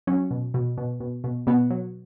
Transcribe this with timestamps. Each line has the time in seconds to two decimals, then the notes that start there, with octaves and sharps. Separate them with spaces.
0.07 F#3 C#4
0.31 B2
0.54 B2
0.78 B2
1.00 B2
1.24 B2
1.47 B2 B3
1.70 F#3